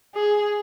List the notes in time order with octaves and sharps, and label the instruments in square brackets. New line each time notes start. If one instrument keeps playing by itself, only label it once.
[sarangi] G#4